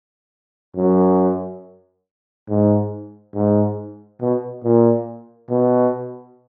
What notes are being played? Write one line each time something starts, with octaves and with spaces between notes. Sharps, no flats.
F#2
G#2
G#2
B2
A#2
B2